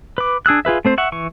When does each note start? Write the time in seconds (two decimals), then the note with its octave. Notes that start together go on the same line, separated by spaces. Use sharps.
0.18 B4 D6
0.46 D4 G#4 E6 F#6
0.65 F4 G#4 B4 E5
0.85 A3 C4 C5
0.98 E5 F#5 C#6
1.12 E3 C#6